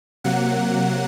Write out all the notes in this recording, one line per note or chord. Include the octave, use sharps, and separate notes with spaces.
C3 F#3 A#3 F#5